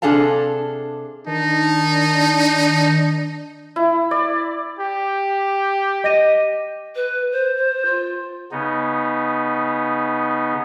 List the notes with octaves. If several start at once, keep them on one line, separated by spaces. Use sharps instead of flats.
C3 D4 G#4 A4 F5 A5
D#3 D4 D#4 A5
E4
D5
G4
D#5 A#6 D#7
B4
C5
C5
F4
C#3 B3 D#4